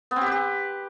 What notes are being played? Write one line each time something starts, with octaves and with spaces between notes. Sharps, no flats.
B3
C4
G4
B4
G4